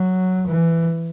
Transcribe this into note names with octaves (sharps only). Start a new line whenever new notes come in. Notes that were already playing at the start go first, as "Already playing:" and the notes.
Already playing: F#3
E3